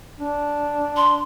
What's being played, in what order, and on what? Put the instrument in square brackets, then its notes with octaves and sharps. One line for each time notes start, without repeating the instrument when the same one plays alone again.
[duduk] D4
[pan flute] C6